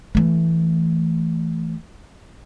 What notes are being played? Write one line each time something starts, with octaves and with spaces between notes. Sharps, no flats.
E3 A3